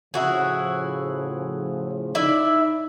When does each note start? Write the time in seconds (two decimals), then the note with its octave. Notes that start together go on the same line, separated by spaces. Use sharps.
0.14 A2 C#3 F3 E4 F#4 G#4
2.15 D#4 E4 D5 E5